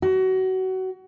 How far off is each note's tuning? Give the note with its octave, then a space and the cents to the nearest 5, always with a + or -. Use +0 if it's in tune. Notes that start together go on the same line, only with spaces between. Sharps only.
F#4 +25